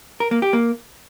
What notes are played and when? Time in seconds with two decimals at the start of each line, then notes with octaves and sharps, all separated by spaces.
0.20 A#4
0.31 A#3
0.42 G4
0.53 A#3